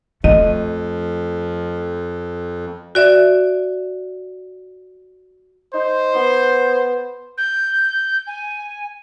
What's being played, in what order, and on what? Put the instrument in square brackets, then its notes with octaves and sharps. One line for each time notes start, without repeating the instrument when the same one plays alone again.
[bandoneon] F2 [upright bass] A3 [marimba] D#5
[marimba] F#4 D5 E5
[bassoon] D#4 [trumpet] C5
[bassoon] B3
[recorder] G6
G#5